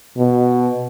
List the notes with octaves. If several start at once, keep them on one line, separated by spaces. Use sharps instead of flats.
B2